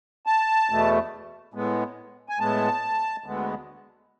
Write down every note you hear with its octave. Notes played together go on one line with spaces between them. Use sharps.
A5
E2 B2 A3
A2 G#3 B3
G#5
A2 G#3 B3 A5
D2 D3 G#3 B3